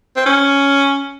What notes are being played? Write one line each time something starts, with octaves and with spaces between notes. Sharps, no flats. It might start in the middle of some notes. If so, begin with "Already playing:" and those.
C4
C#4